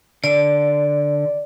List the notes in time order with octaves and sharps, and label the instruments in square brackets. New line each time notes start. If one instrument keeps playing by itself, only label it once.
[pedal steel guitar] D3 [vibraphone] D5